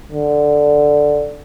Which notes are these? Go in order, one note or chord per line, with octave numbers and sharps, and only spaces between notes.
D3